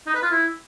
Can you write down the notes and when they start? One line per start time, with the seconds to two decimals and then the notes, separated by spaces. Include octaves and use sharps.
0.06 D#4
0.14 B4
0.22 F4
0.31 E4